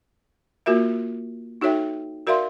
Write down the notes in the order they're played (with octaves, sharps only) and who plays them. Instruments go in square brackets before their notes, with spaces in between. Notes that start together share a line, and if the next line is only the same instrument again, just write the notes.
[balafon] A#3 F4 F#4 A#4 E5
D#4 F#4 A4 C#5 E5 G5
F#4 A#4 D5 E5 F5 C6